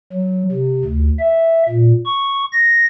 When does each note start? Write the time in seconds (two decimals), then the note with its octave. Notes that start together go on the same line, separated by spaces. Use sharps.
0.12 F#3
0.51 C3
0.84 D2
1.19 E5
1.69 A#2
2.06 C#6
2.52 A#6